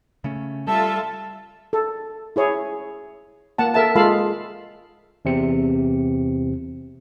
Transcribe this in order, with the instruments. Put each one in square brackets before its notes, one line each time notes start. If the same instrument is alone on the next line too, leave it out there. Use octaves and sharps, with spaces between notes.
[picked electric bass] C#3 A3 C#4
[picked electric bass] G3 [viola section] F4 A4 E5 [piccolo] A5
[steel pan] A4
E4 G#4 C#5
A#3 F#5 A5
A4 A#4 E5 A5
G#3 F4 A4 F5 A5 B5
[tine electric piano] E2 C3 C4 C#7